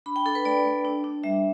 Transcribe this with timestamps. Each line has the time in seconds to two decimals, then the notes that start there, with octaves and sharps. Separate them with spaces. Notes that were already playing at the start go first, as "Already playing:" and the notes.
0.06 D4 B5
0.16 G5
0.25 D4 A4
0.35 B4
0.45 A3 D5
0.65 A3
0.85 D4
1.04 D4
1.24 G3 E5